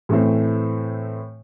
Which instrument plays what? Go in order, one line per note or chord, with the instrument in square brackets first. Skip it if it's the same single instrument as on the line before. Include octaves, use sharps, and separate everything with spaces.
[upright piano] A2 E3 A3 C4